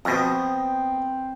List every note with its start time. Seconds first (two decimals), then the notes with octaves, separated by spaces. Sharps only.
0.05 F2 B2 B3 C4 C5 D#5